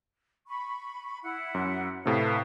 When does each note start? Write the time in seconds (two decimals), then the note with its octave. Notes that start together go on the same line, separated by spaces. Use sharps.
0.47 B5 C#6
1.22 E4 F#5
1.54 F#2
2.06 A2 C3 B4 F5 A5